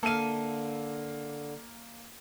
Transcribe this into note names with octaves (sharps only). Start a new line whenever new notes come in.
D3 A#3 A4 E5 F5 D#7